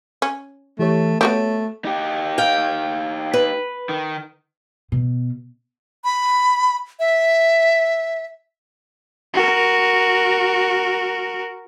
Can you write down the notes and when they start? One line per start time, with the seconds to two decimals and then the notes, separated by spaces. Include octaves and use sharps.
0.22 C#4
0.79 E3 A3 G4 C#5
1.21 A3 B3 F#4 G4 C#5
1.85 D#4 G4
2.38 F5 G5
3.34 B4
3.89 D#3
4.92 B2
6.04 B5
6.99 E5
9.34 F#4 A#4